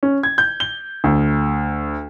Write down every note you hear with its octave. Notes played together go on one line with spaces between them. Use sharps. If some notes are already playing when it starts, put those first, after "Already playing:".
C#4
G#6
G6
G7
D2